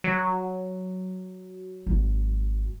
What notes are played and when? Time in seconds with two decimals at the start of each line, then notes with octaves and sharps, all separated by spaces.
0.04 F#3
1.87 G#1